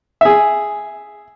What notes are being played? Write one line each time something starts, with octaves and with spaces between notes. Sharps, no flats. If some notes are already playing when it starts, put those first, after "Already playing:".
G#4 E5